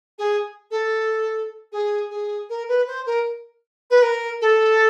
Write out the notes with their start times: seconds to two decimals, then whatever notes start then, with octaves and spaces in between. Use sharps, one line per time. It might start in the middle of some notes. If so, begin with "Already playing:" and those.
0.18 G#4
0.71 A4
1.72 G#4
2.10 G#4
2.49 A#4
2.68 B4
2.87 C5
3.06 A#4
3.90 B4
4.02 A#4
4.41 A4